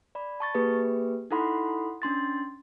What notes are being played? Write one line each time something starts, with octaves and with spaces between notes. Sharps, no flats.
D5 B5
A5 C#6 A6
A#3 G4 G#4 B4
D#4 E4 A4 F#5 B5 C6
C#4 D4 C6 A6